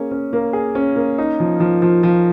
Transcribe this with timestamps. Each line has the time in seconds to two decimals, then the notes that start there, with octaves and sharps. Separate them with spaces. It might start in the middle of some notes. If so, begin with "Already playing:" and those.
Already playing: A#3 C#4 G#4
0.11 C#4
0.33 A#3
0.53 G#4
0.75 C#4
0.96 A#3
1.18 D#4
1.40 F3
1.60 F3
1.82 F3
2.03 F3